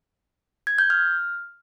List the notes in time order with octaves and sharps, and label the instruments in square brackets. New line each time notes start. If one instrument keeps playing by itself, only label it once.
[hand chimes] G#6
G6
F6